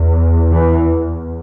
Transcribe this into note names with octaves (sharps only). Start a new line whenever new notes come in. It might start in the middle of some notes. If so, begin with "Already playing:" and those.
Already playing: E2
E3